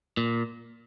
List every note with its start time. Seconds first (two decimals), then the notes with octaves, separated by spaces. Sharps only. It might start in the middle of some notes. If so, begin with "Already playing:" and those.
0.17 A#2